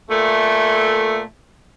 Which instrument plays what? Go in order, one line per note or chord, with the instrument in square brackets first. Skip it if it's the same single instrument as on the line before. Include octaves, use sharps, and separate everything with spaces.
[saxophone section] A#2 A3